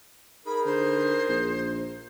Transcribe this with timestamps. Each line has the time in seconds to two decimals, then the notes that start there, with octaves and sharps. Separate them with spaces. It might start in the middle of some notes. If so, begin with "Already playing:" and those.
0.46 D#4 G#4 A#4 B5
0.65 D3 C5
1.29 A#1